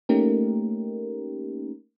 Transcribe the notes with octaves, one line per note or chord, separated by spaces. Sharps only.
A3 A#3 C#4 D#4 G4 A#4